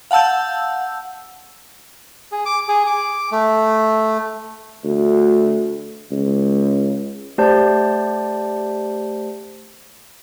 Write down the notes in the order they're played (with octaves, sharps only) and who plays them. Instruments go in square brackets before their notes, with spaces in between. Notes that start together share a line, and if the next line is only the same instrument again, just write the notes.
[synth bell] F5 F#5 A5 E6 G6
[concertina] G#4
D6
G#4
D6
A3
[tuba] D2
C#2
[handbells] A3 G4 C5 D5 A5 G6